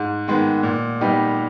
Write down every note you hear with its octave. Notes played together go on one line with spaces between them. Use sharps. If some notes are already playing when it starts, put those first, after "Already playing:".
Already playing: G#2
D#3 G#3 B3
A#2
G3 B3 D#4 G4